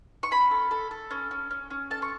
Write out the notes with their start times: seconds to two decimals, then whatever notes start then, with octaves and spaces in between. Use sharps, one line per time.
0.23 C#6
0.31 C#4 B5
0.51 A4
0.71 A4
0.91 A4
1.11 C#4
1.31 C#4
1.51 C#4
1.70 C#4
1.90 A4 A5
2.02 C#6